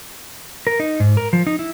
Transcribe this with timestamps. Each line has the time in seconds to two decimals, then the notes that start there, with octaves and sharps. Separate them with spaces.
0.67 A#4
0.80 D#4
1.00 G#2
1.17 A#4
1.33 F3
1.47 D#4
1.59 E4